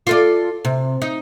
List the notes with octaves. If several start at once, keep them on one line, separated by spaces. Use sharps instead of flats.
F4 A4 D5
C3
D#4